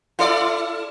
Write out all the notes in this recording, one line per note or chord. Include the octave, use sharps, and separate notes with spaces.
E4 A4 D5